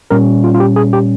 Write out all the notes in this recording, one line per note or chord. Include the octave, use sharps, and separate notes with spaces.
A#2 G3 C#4 A#4
F4
F4
G4
G#4
G4